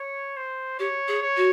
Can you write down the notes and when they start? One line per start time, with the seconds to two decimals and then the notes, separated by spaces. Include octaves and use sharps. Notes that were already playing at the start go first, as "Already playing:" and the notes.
Already playing: C#5
0.36 C5
0.79 G4 C#5
1.08 G#4
1.22 C#5
1.37 F#4